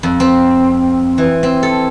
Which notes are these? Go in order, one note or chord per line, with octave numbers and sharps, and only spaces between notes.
F2
C4
E3
C4
A4